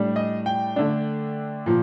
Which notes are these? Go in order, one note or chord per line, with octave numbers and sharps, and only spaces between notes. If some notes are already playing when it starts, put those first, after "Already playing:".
Already playing: A2 G3 D4
D#5
G5
D3 A3 D4
A#2 F3